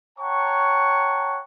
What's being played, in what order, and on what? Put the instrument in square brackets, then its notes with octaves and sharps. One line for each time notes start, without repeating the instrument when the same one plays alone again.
[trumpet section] C#5 F#5 G5 A5 A#5 C#6